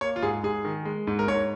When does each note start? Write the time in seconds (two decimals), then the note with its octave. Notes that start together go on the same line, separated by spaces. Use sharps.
0.01 A#3 C#5
0.16 F4
0.22 G#2 G#4
0.43 G#2 G#4
0.65 D#3
0.85 G#3
1.07 G#2
1.19 A#4
1.28 G#2 C#5